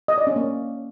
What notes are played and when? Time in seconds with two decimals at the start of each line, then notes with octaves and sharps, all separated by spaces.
0.08 D#5
0.18 D5
0.27 C#4
0.36 A#3